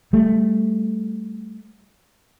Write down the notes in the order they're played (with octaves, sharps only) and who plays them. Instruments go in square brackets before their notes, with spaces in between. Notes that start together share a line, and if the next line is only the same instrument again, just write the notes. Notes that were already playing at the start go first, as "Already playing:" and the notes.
[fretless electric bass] G3 A3